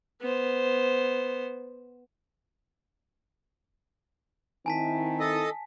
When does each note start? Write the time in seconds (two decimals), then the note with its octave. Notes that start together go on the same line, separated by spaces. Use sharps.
0.21 B3 C5
4.66 D#3 C4 E4 G#5 A5 B6
5.20 A4 D#5